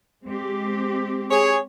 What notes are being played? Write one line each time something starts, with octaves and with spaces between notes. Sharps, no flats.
G#3 C4 G4
G#4 C#5